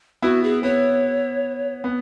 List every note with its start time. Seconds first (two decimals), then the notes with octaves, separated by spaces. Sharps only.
0.22 B3 E4 F#4
0.43 G#4
0.63 B3 C#5
1.84 B3